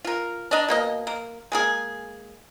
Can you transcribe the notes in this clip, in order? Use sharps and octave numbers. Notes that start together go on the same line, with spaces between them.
F4 A#4
D4 D#5 A#5
B2 A#3 D#5
A#3
G#3 A#3 G#4